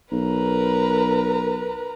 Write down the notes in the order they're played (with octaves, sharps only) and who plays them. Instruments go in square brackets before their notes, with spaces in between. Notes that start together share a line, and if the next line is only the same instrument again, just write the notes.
[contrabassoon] B1 [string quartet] A#4 B4 A#5